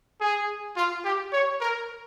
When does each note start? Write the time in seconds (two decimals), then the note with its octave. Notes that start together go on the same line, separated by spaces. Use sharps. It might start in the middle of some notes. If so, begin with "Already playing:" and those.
0.20 G#4
0.76 F4
1.05 G4
1.33 C#5
1.60 A#4